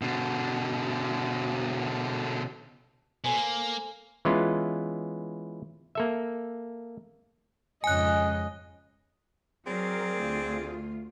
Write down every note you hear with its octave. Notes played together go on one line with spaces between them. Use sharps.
B2 D3
B2 A4 C5 G#5
A#3
E3 G#3 B3 C#4 F4
A#3 A4 E5
F2 G#2 C#3 D#5 G#5 F#6
F#3 C4 G#4 A#4 D5
D2 F4